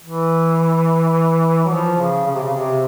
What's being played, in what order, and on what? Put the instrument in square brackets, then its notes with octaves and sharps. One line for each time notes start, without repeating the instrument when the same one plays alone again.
[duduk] E3
F#3
F3
C#3
C#3
C3
C#3
C3